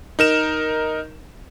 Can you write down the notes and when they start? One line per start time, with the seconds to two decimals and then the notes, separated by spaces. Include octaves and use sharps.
0.19 D#4 A#4 E7